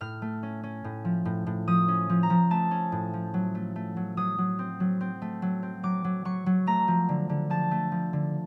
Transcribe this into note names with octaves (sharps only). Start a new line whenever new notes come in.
A2 F6
A3
C#4
C#4
A2
F3
A2
A2
F3 D#6
C#4
F3
A#5
F3
A3 A5
C#4
A2
F3
F#3
A3
A3
F#3
F#3 D#6
F#3
C4
F#3
C4
A3
F#3
C4
F#3 D6
F#3
F#3 C#6
F#3
A3 A#5
F3
D3
D3
F3 A5
A3
F3
D3